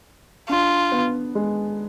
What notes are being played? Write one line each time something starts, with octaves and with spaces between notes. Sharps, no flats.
D4 F4
B3
G#3